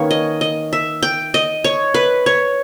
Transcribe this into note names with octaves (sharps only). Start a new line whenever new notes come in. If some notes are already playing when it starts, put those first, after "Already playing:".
Already playing: D#3 A#3 C#4 B4 C#5
D#5
D#5
E5
G5
D#5
C#5
B4
C#5